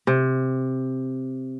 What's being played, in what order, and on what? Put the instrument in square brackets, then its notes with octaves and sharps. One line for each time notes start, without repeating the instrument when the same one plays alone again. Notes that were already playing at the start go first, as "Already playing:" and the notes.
[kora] C3